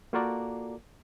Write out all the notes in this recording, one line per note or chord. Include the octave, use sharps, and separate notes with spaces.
A#3 F4 F#4 A4 A#4 D5